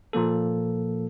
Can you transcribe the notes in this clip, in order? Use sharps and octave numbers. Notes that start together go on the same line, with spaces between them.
A#2 F3 A#3 A4